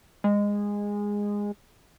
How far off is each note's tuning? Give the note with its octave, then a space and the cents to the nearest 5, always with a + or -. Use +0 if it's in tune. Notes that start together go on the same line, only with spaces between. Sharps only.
G#3 -15